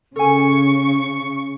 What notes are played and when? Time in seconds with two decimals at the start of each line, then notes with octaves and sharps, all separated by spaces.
0.16 C#3 A4 G#5 C#6